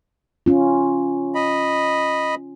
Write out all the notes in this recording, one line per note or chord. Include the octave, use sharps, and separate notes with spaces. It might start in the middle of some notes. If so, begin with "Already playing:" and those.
C#4 F4
D#5 B5